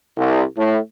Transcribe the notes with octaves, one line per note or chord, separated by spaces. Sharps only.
C2
A2